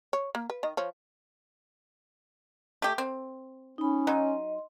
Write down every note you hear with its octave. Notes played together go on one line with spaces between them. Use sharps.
C#5
A#3
B4
D#3 D#5
F3 C#5
A3 G4
C4
C#4 D#4 B5
F#3 D#4 D#5 C6